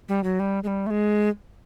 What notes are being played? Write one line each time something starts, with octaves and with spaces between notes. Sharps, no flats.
G3
F#3
G3
G#3
G3
A3
G#3